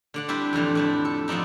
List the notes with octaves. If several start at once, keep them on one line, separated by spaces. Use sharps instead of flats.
D3 D5 F#5
G3 C4 D4 E4 G4
F2 A2 D3 E3
F2 D4 E4
A4
F3 B3 C4 D4 D#4